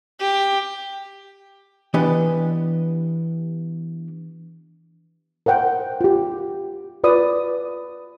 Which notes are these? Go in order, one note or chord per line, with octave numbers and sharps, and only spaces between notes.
G4
E3 B3 D4 G4 B4 D#5
A#4 C5 F#5 G5
F4 G4
F4 B4 D5 D#6